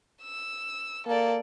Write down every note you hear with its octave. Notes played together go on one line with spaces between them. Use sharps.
E6
A#3 A4 D5